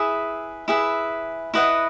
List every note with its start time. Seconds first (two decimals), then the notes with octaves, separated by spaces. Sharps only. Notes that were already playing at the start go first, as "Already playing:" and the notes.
Already playing: E4 G#4 B4 E5
0.68 E4 G#4 B4 E5
1.54 E4 B4 D#5 F#5